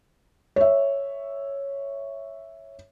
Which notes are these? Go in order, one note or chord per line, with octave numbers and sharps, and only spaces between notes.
C#5 E5